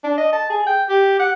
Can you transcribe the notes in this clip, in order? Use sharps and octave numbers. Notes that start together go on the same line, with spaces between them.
D4
D#5
A5
G#4
G5
G4
F#5